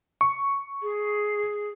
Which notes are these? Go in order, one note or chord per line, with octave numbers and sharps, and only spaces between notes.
C#6
G#4